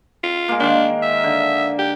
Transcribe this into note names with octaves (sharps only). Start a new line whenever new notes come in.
F4
G#3 A#3
D#3 D4 F5
E5
D3
G4